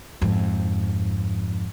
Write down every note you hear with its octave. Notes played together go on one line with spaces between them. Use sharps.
F2 G#2